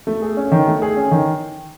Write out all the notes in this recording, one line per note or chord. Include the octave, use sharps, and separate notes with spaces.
A3
G#4
C#4
D#3
A3
G#4
C#4
D#3